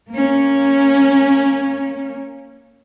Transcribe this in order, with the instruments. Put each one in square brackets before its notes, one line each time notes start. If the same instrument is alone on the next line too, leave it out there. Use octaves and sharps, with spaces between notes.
[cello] A#3 C#4